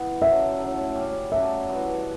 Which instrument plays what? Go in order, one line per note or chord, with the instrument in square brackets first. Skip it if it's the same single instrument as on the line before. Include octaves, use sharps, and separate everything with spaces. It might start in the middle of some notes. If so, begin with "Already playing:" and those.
Already playing: [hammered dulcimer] E3 B3
[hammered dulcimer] F#2 D3 F#3 [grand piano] E5
[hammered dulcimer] A2 F#3 A3
G3 C#4 G4
[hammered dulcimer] C#3 F#3 A3 D4 [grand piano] E5
[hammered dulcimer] G2 E3 B3 F#4